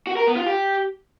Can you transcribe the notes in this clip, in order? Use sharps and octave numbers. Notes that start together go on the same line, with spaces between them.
F#4
A#4
B3
F4
G4